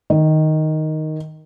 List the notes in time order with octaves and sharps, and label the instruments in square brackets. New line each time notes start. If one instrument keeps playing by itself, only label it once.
[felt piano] D#3